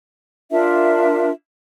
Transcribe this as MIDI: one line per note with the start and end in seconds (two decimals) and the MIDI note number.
0.51 1.30 62
0.51 1.30 65
0.51 1.30 70
0.51 1.30 76